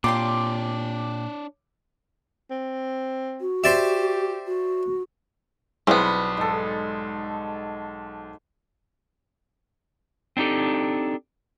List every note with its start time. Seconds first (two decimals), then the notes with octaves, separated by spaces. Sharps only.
0.04 A#2 D4 F4 G4 C#5 C6 D6
2.51 C4
3.41 F#4
3.64 G4 C5 D5 E5
4.47 F#4
5.87 B1 G3 B3 C4 E4 G#4 C6
6.37 G#2 A4
10.37 C4 D4 D#4 G4 A4